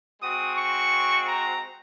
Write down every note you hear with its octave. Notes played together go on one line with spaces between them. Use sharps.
G#3 C4 F#4 D#6
C#6
A#5